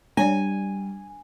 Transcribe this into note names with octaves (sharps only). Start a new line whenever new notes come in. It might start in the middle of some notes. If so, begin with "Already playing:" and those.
G3 D4 C#5 D5 G#5